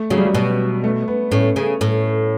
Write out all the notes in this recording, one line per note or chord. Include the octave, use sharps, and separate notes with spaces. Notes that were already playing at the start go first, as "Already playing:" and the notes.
Already playing: A3
C#3 F#3
G3
F#3
B2
A3
B3
A2 C#4
C#3
A2